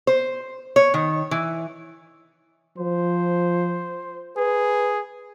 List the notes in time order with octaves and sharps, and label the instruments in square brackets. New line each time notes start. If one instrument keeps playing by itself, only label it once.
[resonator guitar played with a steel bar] C5
C#5
D#3
E3
[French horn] F3 [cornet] C5
[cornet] G#4 [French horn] B4